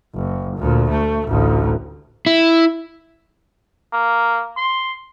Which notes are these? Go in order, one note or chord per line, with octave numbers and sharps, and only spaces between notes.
F#1
D2 A#2
A3
A1 D2
E4
A#3
C6